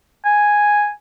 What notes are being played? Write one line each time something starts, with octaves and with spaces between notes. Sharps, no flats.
G#5